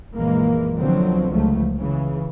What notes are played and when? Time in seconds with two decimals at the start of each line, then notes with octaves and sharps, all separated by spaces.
0.14 A#1 F#2 E3 G#3 A#3
0.77 C2 B2 D3 F3 F#3 C4
1.29 C#2 F3 F#3 A3
1.76 C#3 E3